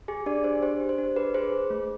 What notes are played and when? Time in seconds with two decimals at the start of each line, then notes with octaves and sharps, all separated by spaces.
0.08 G4 G#4 G#5
0.26 D4 G4 D5
0.44 D4 C5
0.62 G4 C5
0.81 G4
0.89 C5
0.98 D4
1.16 G#4 B4
1.34 G#4 C5
1.52 G#4
1.70 A3